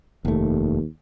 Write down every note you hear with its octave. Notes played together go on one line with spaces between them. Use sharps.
F1 D#2 A3